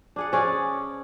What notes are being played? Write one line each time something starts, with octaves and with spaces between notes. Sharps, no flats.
D4 G#4 F#5
F3 C#4 G#4 D5